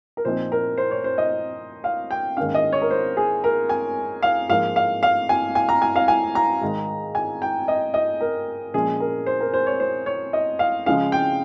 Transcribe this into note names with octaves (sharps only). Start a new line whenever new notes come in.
A#4
A#2 F3 C4 D#4 C5
A#4
C5
C#5
C5
D#5
F5
G5
G#2 D#3 A#3 C#4 F5
D#5
C#5
A#4
C5
G#4
A#4
G#5
F5
G#2 F3 A#3 D#4 F5
F5
F5
G#5
G#5
A#5
G#5
F5
G#5
A#5
G#2 D#3 G#3 D#4
G#5
G5
D#5
D#5
A#4
A#2 F3 G#3 C#4 G#4
A#4
C5
A#4
C5
C#5
C5
C#5
D#5
F5
C#3 F3 G#3 C#4 F5
G5